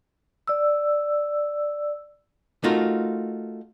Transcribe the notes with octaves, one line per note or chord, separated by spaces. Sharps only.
D5 E6
A3 D#4 F4 F#4 A#4